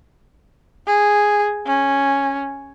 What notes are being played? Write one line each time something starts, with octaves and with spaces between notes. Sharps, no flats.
G#4
C#4